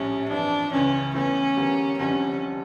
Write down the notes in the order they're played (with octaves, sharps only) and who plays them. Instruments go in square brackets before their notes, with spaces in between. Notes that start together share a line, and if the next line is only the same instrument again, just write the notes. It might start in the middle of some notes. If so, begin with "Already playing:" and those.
Already playing: [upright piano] A#1 A2 G3 [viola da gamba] C#4
[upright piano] G1 F2 E3 [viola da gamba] D4
[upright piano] C#2 C#3 E3 [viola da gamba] C#4
[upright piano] E2 E3 A3 E4 [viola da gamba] C#4
[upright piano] E2 D3 G3 A#3
[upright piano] F1 F2 D3 G3 D4 [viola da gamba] C#4